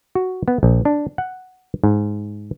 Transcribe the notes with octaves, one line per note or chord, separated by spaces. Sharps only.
F#4
B3
A#1
D4
F#5
G#2